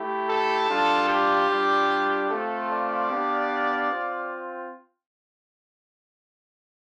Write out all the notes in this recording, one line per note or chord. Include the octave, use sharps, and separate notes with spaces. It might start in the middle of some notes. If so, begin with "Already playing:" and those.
Already playing: A3 E4 G4
A4
G3 D4 F4
G4
G3 D4 F4
A3 C4 F4 A4
D5 F5
B3 D4 G4
C4 F4